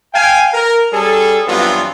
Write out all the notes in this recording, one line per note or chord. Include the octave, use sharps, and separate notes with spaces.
F5 G5 G#5
A#4
G3 C#4 G#4 A4
G2 E3 F#3 B3 C4 F4